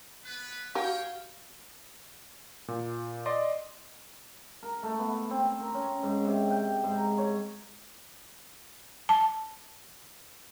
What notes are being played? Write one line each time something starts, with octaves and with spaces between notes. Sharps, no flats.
B3 B4
F#4 G4 C#5 F5 G5 G#5
A#2
D5 D#5 C6
A#4
A3
B3
C4
A#4
C#4
G#2
C3
G5
G#2
A#5
C#5
A5